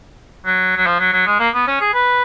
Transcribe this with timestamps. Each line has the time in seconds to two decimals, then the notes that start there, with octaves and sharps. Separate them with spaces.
0.45 F#3
0.77 F#3
0.86 F3
0.99 F#3
1.13 F#3
1.26 G#3
1.40 A#3
1.54 B3
1.67 C#4
1.81 G#4
1.94 B4